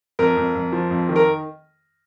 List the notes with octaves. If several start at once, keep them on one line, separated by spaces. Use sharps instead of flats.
F2 A#4
F2
F2
F3
F2
D#3
A#4